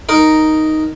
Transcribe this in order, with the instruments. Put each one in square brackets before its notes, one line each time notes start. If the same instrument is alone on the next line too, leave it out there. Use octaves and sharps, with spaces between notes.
[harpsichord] D#4 A#4